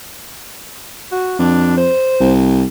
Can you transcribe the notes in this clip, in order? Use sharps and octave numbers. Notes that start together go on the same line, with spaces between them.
F#4
F2 D4
C5
C2